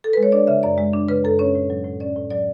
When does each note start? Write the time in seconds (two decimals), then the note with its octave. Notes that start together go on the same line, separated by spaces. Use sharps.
0.04 A4
0.13 G#3 B4
0.23 C#5
0.32 D4 D5
0.47 C#3 E5
0.63 F#2 D5
0.78 G#3
0.93 D4
1.09 C#3 B4
1.25 F#2 A4
1.39 C#4 C#5
1.55 A2
1.70 F#3
1.84 A2
2.00 C#4 D5
2.16 A2
2.30 F#3 D5